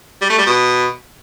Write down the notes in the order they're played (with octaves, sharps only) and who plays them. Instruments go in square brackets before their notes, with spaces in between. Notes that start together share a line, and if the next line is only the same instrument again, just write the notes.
[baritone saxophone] G3
A3
G3
B2